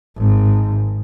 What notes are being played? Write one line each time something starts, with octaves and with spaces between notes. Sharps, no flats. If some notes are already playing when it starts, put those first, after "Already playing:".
G#1